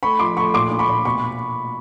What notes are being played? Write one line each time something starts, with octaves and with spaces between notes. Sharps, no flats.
A3 B5 C#6
F3 C6 D6
A3 B5 C#6
A#2 C6 D6
D4
B5 C#6
A#2
B2 B5 C#6